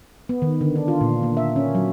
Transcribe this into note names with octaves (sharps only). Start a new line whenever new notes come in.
B3
D#3
D3
D4
F4
A#2
A#3
E5
C#4
F#3